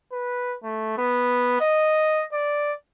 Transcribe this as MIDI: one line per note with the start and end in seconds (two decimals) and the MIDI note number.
0.12 0.56 71
0.64 0.94 57
0.98 1.60 59
1.61 2.24 75
2.33 2.73 74